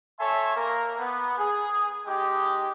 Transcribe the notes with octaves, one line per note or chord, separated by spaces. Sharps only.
A4 C#5 E5 G#5 C6
A#3 A#4
B3
G#4
G#3 D#4 G4